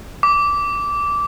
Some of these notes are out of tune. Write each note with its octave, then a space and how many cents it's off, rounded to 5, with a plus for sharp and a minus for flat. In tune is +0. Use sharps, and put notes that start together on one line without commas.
D6 -15